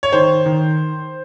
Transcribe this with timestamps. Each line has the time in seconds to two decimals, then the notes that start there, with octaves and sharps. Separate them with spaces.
0.03 C#5
0.13 D#3 C5
0.46 D#3